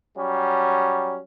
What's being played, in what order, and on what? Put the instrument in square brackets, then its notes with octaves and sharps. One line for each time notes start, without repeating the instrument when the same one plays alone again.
[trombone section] F#3 G3 C#4